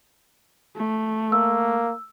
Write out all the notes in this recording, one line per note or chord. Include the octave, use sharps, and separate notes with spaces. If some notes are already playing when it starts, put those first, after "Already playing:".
A3
A#3 E6